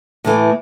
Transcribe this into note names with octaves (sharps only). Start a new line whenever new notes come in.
A2 E3 A3